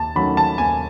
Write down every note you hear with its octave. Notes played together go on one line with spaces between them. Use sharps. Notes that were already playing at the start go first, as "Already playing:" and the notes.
Already playing: D#2 A5
D#3 F#3 A3 C#4 B5
A5
D#2 G#5